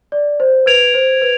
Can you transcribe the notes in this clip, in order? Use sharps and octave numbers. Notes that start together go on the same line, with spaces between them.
D5
C5
B4 G#6 D7 F7
C5
B4